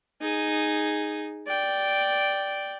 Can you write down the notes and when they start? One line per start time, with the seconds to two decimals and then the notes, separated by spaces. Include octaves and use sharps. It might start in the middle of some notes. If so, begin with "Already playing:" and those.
0.21 D#4 G#4
1.47 D5 G5